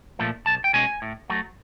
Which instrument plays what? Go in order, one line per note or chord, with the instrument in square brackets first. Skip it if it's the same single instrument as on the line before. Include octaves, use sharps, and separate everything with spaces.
[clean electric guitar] A#2 F3 A3
B1 A5
G5
B2 G#3 C#4 G#5
A2
F#3 A3